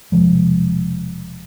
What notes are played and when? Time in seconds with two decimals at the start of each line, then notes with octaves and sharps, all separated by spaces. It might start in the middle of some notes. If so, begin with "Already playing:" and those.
0.12 E1 C3 F3 G#3